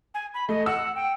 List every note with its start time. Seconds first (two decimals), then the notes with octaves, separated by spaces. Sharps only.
0.14 G#5
0.34 B5
0.49 A3 D#5
0.66 F#5 E6
0.95 G5